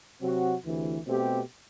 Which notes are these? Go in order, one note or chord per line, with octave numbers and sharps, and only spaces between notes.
C3 F#3 C4 F#4
D2 C3 E3
B2 A3 C4 G4